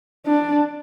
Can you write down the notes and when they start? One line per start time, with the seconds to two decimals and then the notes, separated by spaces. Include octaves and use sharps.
0.26 D4